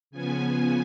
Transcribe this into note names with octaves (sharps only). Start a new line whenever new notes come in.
C#3 F3 B3 G#5